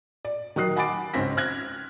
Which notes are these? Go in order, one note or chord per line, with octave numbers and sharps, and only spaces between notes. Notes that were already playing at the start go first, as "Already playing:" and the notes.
D5
D#3 F#3 D#6 F#6 C7
F#5 G#5 B5 D6 A6 D7
C#2 G#2 C4 C#4 A#6 B6
F6 F#6 G#6 A#6